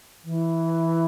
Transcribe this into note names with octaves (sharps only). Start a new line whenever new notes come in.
E3